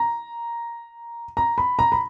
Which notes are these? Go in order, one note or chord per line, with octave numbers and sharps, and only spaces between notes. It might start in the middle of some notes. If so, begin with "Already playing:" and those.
Already playing: A#5
A#5
B5
A#5
B5